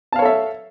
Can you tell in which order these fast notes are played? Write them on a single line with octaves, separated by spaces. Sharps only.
A5 F5 C#5 A4 E5